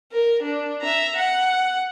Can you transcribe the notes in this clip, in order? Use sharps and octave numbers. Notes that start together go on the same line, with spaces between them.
A#4
D4
E5 A#5
F#5